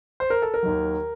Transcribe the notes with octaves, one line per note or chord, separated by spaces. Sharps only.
C5
A#4
A4
A#4
D#2 D#3 F#3